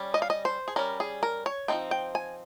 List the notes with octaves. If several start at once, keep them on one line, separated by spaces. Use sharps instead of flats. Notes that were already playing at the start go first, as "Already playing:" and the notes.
Already playing: G3 C#4
D#5
F5
D#5
C5
G#4
G3 C#4 A#4
G#4
A#4
C#5
F3 C4 D#4 G5
G5
G#5